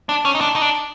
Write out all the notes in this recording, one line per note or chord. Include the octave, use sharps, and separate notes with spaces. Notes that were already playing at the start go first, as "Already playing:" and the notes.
D4
C#4
D#4
D4
D#4
D4